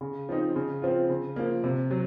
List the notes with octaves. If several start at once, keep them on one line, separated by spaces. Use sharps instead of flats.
C#3
F3 C4 D#4
C#3
F3 C4 F4
C#3
F3 A#3
C3
F#3